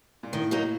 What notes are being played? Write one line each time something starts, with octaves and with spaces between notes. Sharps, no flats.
A#2
A2 D#3
F#3 A#3 D#4